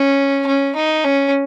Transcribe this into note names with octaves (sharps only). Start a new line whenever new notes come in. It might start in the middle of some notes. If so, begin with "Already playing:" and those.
Already playing: C#4
C#4
D#4
C#4